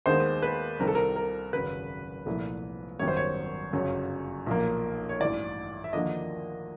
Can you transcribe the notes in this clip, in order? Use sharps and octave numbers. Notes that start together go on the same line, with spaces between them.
D#2 D#3 G#3 B3 D#4 C5
B4
C2 C3 D#3 G3 C4 A#4
A4
A#4
A#4
G#1 F#2 C#3 B4
C2 A#2 F3 A3
G#1 F#2 D#3 G3 B3 C#5
C5
C#5
G1 F#2 C#3 F#3
B1 A#2 F3 A#3
C#5
A1 G2 E3 D5
E5
D#2 D3 F3 A#3 D4 D#5